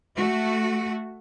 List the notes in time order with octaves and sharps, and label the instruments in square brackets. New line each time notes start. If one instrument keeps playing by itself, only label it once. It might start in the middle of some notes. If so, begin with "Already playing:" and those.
[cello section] A3 F#4